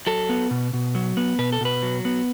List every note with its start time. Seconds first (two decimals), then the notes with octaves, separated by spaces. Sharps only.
0.07 F#3 A4
0.29 B3
0.51 B2
0.73 B2
0.95 F#3
1.17 B3
1.39 B2 B4
1.52 A4
1.61 B2 B4
1.83 F#3
2.05 B3